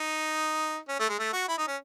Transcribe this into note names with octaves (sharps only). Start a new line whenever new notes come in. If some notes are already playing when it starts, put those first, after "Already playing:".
Already playing: D#4
C#4
A3
G#3
A3
F#4
E4
D#4
C#4